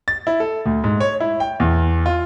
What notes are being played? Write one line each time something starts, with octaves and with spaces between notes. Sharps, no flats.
A6
E4
A4
D2
G#2
C#5
E4
G5
E2
F4